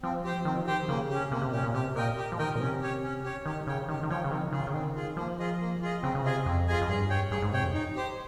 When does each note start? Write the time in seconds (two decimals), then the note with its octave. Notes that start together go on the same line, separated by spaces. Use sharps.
0.03 F3 C4
0.24 G4 C5 G5
0.45 D#3 C4
0.57 F3
0.67 D#3 G4 C5 G5
0.89 C#3 A#3
1.09 C#4 G4
1.32 C3 A#3
1.42 C3
1.52 A#2 G4
1.55 C#4
1.64 A#2
1.74 C3 G4
1.95 A#2 A#4 D#5 G5
2.17 G4
2.32 F3
2.38 D#3 A#4 D#5 G5
2.55 A#2
2.60 C3 C#4
2.81 G4 C#5
3.03 C#4
3.24 G4 C#5
3.46 D#3 G4
3.67 C#3 C#5 G5
3.89 D#3 G4
4.03 D#3
4.09 F3 C#5 G5
4.24 C#3
4.31 D#3 C4
4.53 C#3 F4 G#4
4.67 C#3
4.74 D#3 C4
4.96 F4 G#4
5.17 F3 A#3
5.39 F4 G#4 D#5
5.61 A#3
5.82 F4 G#4 D#5
6.02 C#3 C4
6.15 C#3
6.24 C3 F4 G#4 D#5 G#5
6.46 F2 C4
6.68 F4 G#4 D#5 G#5
6.81 F2
6.89 G2 G#4
7.10 C#5 G5
7.31 G2 G#4
7.42 G#2
7.53 C3 C#5 G5
7.63 F2
7.74 D#4
7.96 G4 C5